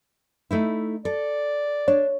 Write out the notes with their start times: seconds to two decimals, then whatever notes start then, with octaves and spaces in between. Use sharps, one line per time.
0.51 A3 D#4 E4
1.05 A4 D5
1.88 D4 C#5